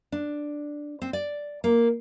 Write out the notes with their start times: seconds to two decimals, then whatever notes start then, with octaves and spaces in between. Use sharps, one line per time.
0.12 D4
1.02 C4
1.13 D5
1.64 A#3